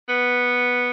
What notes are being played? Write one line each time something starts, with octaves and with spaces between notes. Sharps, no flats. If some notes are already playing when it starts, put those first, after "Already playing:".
B3